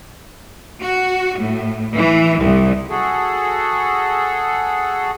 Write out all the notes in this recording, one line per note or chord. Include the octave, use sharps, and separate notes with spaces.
F#4
A2
E3
C2
F#4 G#4 A4